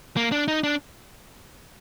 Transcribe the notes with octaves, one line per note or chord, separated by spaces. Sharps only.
A#3
D4
D#4
D4